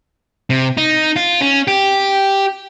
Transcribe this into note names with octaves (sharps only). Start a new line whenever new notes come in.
C3
D#4
F4
C#4
G4